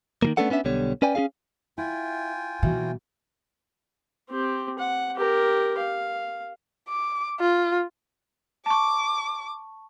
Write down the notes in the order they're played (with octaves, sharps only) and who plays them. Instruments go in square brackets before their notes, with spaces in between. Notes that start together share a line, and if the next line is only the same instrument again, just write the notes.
[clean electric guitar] D#3 F3 A#3
A3 B3 C#4 D4 A4 F#5
B3 C#4 D4 E5
B1 D3 G3 B3 C#5
C#4 B4 D5 G5 G#5
C#4 F#4 G#4 F5
[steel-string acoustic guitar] E4 [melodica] F4 G5 G#5
[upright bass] B2 [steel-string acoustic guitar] E3 F#3 A#3
[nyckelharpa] C4 G4
F#5
G4 A#4
F5
[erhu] D6
F4
[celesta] A5 C#6 [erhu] D6